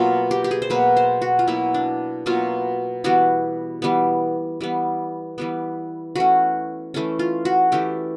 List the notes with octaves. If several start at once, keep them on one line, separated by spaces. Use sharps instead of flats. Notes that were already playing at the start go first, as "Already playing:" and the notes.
Already playing: B2 F#3 A#3 F4
G4
G4
G#4
C5
B2 F#3 A#3 B4
C5
F#4
F4
B2 F#3 A#3 E4
D4
B2 F#3 A#3 F4
E3 G3 B3 F#4
E3 G3 B3
E3 G3 B3
E3 G3 B3
E3 A3 C#4 F#4
E3 A3 C#4
F4
F#4
E3 A3 C#4 G4